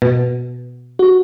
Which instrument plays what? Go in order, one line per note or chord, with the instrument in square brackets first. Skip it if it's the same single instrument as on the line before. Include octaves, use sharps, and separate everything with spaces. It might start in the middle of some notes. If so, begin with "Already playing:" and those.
[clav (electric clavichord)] B2
[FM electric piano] F#4